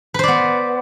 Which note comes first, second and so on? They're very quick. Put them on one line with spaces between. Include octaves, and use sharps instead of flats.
B4 C5 D5 B3